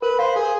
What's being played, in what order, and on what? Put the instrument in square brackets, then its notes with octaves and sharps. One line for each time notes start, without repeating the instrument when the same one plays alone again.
[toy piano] A#4 [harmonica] B4
[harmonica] C5 [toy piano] F5
[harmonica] G#4 [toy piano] A#4